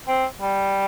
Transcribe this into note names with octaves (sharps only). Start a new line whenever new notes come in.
C4
G3